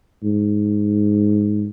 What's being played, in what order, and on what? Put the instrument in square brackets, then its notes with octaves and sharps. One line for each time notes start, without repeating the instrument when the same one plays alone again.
[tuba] G#2